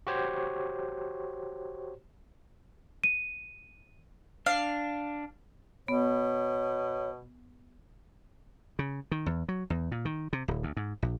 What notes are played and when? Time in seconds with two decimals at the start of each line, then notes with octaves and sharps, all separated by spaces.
0.07 F#4 G4 C5 C#5
3.04 D#7
4.46 D4 F5
5.88 B2 B3 C#5
8.79 C#3
9.11 D#3
9.26 E2
9.49 F#3
9.70 E2
9.92 A#2
10.05 D#3
10.33 C3
10.48 D1
10.63 D2
10.77 G#2
11.02 A#1